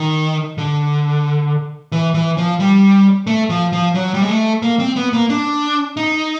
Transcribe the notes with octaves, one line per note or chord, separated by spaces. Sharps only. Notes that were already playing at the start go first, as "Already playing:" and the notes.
Already playing: D#3
D3
E3
E3
F3
G3
A3
F3
F3
F#3
G3
G#3
A3
A#3
C4
B3
A#3
D4
D#4